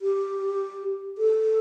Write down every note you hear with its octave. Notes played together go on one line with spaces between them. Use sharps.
G4
A4